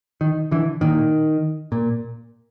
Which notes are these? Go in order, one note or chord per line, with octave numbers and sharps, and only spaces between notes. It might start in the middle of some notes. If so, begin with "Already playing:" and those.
D#3
D3 E3
A#2 D#3
A#2